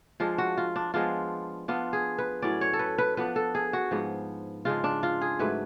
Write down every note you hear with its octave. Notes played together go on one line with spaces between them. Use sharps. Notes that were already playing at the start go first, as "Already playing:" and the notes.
F3 G#3 D4 F4
F#4
F4
D4
F3 G#3 B3 D4 F4
F3 B3 D4 F4
G#4
B4
A2 F#3 C#4 D5
C#5
A4
B4
B4
F3 B3 D4 B4
A4
G#4
F#4
G#2 F3 B3
C#3 G#3 D4 F4
D4
F4
G#4
G#2 F#3 A3 B4